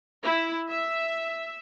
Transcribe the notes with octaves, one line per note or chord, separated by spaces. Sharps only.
E4
E5